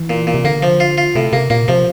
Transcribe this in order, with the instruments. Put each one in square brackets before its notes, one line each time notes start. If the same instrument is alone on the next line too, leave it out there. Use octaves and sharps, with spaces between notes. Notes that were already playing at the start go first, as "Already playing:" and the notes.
Already playing: [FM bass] E3
[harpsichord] A#2
A#2
[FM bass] C3
[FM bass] D3 [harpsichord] A#3
[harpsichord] F3
F4
F4
[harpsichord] A2 [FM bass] C3
[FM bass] C3 [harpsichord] A#3
[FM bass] A#2 [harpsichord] A#3
[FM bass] C3 [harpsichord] F3